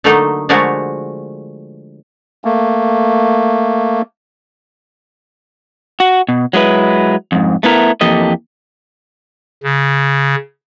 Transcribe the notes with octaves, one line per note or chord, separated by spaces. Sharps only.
D3 F#3 A3 A#3 D#4
D3 F3 G#3 A3 F#4 A#4
A3 A#3
F#4
B2
F#3 G#3 E4 B4
F2 G#2
A3 B3 E4 A#4
F2 E3 A#3 G4 A4 D#5
C#3